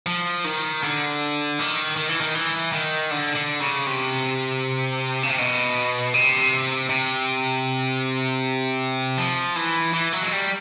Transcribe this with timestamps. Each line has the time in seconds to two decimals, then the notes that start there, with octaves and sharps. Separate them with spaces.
0.06 F3
0.44 D#3
0.83 D3
1.59 D#3
1.96 D#3
2.09 E3
2.21 D#3
2.35 E3
2.72 D#3
3.11 D3
3.35 D3
3.60 C#3
3.86 C3
5.23 C#3
5.30 C3
5.38 B2
6.14 C3
6.89 C3
9.18 F3
9.56 E3
9.93 E3
10.13 F#3
10.23 G#3
10.32 G3